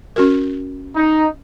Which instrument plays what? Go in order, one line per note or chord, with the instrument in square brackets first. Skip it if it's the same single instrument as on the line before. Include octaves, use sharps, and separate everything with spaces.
[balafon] C#4 F#4 A#4
[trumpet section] D#4